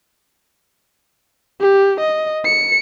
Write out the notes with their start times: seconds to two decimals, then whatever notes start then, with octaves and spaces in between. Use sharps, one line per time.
1.61 G4
2.00 D#5
2.45 C#7